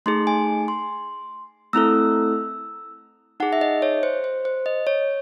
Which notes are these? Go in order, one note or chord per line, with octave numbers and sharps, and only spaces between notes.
A3 D#4 G#4 C6
G#5
C6
A3 C4 E4 A4 E6
D#4 G#4 F#5
E5
D#5
C#5
C5
C5
C5
D#5
C#5